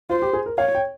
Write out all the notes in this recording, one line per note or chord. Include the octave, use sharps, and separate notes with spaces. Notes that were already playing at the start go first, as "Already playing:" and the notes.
F4 C5
G4
G#4
A#4
C#5 F5
G5